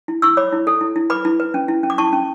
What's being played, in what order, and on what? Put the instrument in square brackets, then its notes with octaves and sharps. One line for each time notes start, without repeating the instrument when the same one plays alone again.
[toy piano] E4
E4 C#6 E6
C#5 B5 D6
E4
A4
E4
E4
B4 B5 D6
E4
B4
C#4
E4
C#4
D6
E4 A5 C#6
C#4